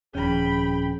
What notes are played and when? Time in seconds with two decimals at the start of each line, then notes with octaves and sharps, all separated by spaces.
0.15 D#1 F2 C#4 G#4 G5 B5